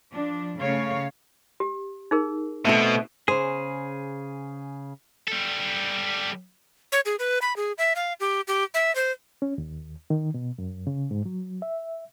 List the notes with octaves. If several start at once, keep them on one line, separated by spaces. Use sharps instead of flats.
F3 D4
C#3 A3 C#4 C#5 F5
G4
D#4 G#4 A#4
B2 A3 C4 A4
C#3 G#4 C5
G3 A4
C#5
G#4
B4
B5
G#4
E5
F5
G4
G4
E5
C5
C#4
D#2
D#3
B2
F#2
C#3
G#2
F#3
E5